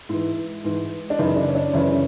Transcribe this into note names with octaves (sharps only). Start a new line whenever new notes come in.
G#2 E3 E4
G#2 E3
D4
F#2 C#3 E3 D#4
D4
C#4
D4
F#2 C#3 E3 C#4